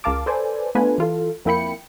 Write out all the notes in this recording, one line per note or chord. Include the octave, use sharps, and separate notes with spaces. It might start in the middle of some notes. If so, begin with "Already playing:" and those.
C#2 A#4 F5 A5 D6
A4 B4 C5 D5 G#5
A3 B3 D4 F4 B4 G#5
E3 F4 A4
F2 A#3 E4 G5 B5 C#7